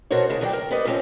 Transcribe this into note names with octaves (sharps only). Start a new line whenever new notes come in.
B2 D4 F#4 A#4 C5 C#5
C#3 A3 E4 G#4
D#2 D#3 F#3 D5 G5
A#4
B3 G4 B4 C5 D5 D#5
C3 F3 G3 A#3 C4 C#4